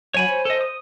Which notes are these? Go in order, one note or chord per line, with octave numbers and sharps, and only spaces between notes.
F#3 C#5 G#5 B5
C5
A4 D#5
D#6